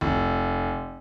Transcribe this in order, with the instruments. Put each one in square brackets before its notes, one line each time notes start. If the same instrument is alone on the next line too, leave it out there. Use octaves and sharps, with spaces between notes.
[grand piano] F1